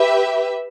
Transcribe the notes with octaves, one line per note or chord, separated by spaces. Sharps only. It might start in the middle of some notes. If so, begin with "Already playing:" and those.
Already playing: G4 B4 E5